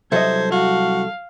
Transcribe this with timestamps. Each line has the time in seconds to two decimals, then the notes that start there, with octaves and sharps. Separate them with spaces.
0.12 C2 F#3 A4 C5 D#5 E5 G#6
0.51 F#4 F5